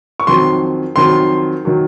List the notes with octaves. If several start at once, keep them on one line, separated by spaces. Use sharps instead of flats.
C#6
F2 D#3 F#3 C6
F2 D#3 F#3 C6
D#3 F#3